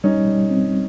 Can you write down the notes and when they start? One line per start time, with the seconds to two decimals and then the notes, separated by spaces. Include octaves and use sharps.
0.04 G3 C#4 D#4
0.27 G3
0.51 C4